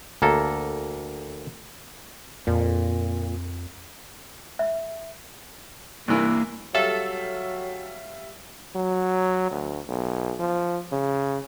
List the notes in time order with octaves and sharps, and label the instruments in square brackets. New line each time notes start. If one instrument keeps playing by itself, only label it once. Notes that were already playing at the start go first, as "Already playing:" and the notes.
[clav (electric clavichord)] D2 A#3 A4
[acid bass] F2 [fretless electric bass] A#2
[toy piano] E5
[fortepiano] G2 C3 E3 [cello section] A#3
[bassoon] F#3 [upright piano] G3 E5 F5 [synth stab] A4
[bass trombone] F#3
D2
B1
F3
C#3